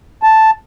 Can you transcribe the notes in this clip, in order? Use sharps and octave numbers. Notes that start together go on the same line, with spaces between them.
A5